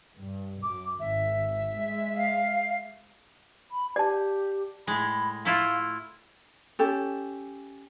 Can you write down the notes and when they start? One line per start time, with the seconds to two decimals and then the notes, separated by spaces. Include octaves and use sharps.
0.18 G2
0.63 F#2 D6
1.00 G#1 E5
1.78 G#3
2.13 F5
3.71 B5
3.96 G4 D5 A5
4.87 A2 G#3 B5
5.45 A3 E4 F4 F5
6.79 C#4 G4 A4